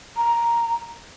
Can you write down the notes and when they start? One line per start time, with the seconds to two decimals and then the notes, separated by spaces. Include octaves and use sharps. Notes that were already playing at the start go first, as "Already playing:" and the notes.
0.17 A#5